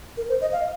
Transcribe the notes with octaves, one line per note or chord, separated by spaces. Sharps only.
A#4
C5
D#5
F5